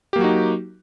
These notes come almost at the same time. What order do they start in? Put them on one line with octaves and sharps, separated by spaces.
G4 A#3 F#3 F#4 D#4